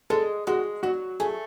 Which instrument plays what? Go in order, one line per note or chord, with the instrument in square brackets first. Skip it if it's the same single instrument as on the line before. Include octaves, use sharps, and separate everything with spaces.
[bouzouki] G#3 [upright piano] A4
[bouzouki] G#3 [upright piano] F#4
[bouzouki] F#3 [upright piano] F#4
[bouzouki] A3 [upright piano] G#4